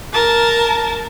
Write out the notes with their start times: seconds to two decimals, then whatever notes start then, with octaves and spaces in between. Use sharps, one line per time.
0.13 A#4 A5